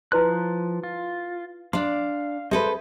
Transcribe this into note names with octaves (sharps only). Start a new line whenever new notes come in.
F3 E4 B4 C6 F#6
F4
D4 D5 F5 C6
G#4 A4 B4 C5 E5